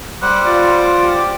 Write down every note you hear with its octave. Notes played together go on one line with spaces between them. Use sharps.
G3 C5 F#5 F#6
F4 D5
G4